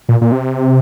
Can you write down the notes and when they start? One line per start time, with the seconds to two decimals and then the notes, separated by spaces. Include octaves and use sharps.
0.09 A#2
0.21 A#2
0.32 C3